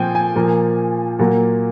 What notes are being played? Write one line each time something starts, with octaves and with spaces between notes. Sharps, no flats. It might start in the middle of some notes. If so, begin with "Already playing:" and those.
Already playing: A#2 F3 C4 G5 G#5
G#5
A#2 F3 A#3
A#2 F#3 A#3